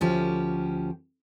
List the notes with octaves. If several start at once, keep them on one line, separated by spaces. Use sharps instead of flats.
D2 F3 C#4 G4